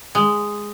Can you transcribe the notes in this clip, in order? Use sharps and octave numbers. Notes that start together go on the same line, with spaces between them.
G#3